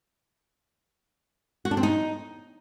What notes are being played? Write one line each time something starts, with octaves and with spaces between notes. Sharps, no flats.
F#4
D4
C4
D#4